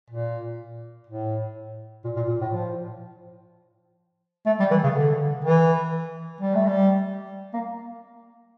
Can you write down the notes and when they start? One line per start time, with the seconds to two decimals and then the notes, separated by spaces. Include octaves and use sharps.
0.10 A#2
1.07 A2
2.05 A#2
2.16 A#2
2.28 A#2
2.41 A2
2.52 F3
4.46 A3
4.60 G3
4.71 E3
4.84 C#3
4.95 D3
5.45 E3
6.41 G3
6.55 A3
6.67 G3
7.54 A#3